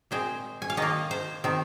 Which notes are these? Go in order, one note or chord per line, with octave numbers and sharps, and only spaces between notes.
A#2 G#3 C4 C5
G#5
F5
D#3 A#3 D#5
C5
D#3 C4